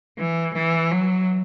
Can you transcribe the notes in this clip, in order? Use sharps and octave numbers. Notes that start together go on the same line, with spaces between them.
E3
E3
F#3